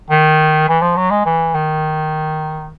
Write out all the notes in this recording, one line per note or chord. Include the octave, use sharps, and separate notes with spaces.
D#3
E3
F3
F#3
G#3
E3
D#3